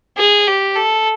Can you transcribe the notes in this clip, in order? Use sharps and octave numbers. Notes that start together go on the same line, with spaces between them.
G#4
G4
A4